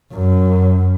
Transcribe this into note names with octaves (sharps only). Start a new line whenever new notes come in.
F#2